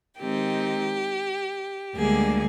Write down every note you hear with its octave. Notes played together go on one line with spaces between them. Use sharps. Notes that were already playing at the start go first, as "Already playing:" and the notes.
D#3 G#3 C4 D#4 G4
D2 D3 G3 G#3 A#3 G#4